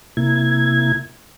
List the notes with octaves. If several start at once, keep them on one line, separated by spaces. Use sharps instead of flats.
C3 A#3 E4 G#6